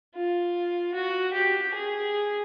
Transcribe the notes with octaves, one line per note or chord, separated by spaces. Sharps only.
F4
F#4
G4
G#4